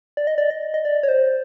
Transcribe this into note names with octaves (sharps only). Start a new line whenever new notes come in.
D5
D#5
D5
D#5
D#5
D5
C#5
C5